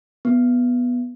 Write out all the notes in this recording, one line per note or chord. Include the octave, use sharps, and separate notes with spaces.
B3